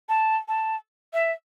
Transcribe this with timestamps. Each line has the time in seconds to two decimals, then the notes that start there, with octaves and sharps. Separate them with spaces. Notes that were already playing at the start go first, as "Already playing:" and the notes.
0.09 A5
0.48 A5
1.13 E5